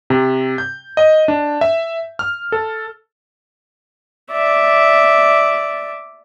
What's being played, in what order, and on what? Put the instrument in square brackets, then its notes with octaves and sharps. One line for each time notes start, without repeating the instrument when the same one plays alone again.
[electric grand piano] C3
G6
D#5
D4
E5
F6
A4
[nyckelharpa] D5 E5